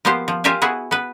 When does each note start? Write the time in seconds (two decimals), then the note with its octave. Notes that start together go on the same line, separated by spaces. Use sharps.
0.05 F3 A#3 B3 G4 C5
0.28 F3
0.44 F4 G4 A#4 E5 G5 G#5
0.62 B3 E4 F#4 G#4
0.91 B3 B4